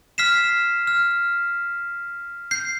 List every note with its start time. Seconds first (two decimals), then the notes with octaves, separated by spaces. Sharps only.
0.18 F6 B6 C7 E7
0.87 F6
2.51 G6 C7